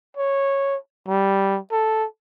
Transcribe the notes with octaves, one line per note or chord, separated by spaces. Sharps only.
C#5
G3
A4